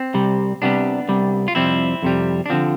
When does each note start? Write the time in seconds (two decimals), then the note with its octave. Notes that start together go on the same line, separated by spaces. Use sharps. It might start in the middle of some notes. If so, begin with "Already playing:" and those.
Already playing: C4
0.14 C2 C3 G3
0.62 C2 C3 G3 B3 D4
1.08 C2 C3 G3
1.48 F4
1.55 F2 C3 G3 C4 E4
2.03 F2 C3 G3
2.46 D4
2.50 D3 F3 C4